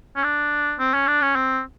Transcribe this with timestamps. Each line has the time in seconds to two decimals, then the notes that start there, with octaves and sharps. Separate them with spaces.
0.16 C#4
0.24 D4
0.79 C4
0.94 C#4
1.08 D4
1.22 C#4
1.36 C4